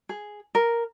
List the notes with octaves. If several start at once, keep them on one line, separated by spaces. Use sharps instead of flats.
G#4
A#4